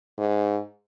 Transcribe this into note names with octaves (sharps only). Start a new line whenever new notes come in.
G#2